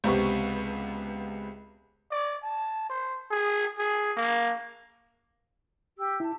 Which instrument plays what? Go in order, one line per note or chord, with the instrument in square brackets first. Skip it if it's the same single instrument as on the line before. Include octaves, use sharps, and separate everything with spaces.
[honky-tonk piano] C#2 C3 B3 C#6
[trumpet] D5
A5
C5
G#4
G#4
A#3
[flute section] G4 E6
[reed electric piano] E4 [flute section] A5